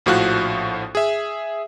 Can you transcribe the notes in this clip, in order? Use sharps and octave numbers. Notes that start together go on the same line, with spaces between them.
A#1 A2 F3 F#4 F5 F#6
G#4 E5